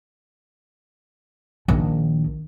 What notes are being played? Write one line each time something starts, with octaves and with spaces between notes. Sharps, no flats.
A#1 D#3